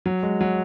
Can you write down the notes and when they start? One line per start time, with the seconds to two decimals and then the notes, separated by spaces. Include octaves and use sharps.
0.06 F#3
0.23 G#3
0.41 F#3